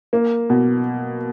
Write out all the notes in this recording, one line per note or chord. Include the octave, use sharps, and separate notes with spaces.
A#3
B2